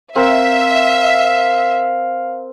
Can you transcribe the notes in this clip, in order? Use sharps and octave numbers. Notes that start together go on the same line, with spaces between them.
C4 A#4 E5 F5